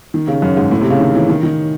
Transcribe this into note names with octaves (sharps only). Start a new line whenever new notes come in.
D#3
C#3
F#2
G#2
A2
C3
C#3
D#3
E3
D#3
D#3